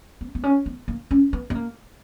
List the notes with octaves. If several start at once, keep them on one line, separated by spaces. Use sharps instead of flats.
B3
B3
C#4
B3
A#3
C#4
B3
B3
A#3